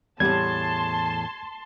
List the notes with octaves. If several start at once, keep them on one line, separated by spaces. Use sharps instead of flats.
E2 A2 G3 A5 C6 G#6